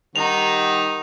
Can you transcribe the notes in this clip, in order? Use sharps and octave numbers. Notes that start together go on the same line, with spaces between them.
D#3 G3 D#4 F#5 F7